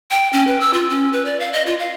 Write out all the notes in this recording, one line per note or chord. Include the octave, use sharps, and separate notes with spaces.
G5
C#4
B4
E6
F4
C#4
B4
D5
F5
D#5
F4
F5